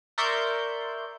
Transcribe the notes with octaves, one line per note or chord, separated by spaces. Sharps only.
A#4 D5 E5 C6 C#6 G6